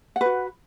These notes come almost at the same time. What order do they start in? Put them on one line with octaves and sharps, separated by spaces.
F#5 B4 F#4